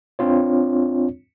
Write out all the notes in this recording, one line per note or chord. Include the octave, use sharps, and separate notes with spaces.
C4 D4 F4 C#5